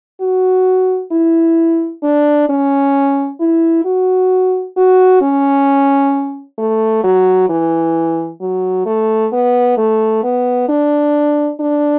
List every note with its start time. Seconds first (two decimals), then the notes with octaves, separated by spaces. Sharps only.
0.21 F#4
1.11 E4
2.03 D4
2.49 C#4
3.40 E4
3.85 F#4
4.77 F#4
5.21 C#4
6.58 A3
7.04 F#3
7.49 E3
8.41 F#3
8.86 A3
9.32 B3
9.77 A3
10.23 B3
10.68 D4
11.60 D4